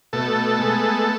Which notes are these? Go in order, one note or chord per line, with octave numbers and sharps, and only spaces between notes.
B2 A3 A4
G#3 B3